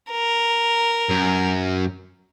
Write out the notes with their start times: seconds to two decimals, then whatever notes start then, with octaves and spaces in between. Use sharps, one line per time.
0.11 A#4
1.09 F#2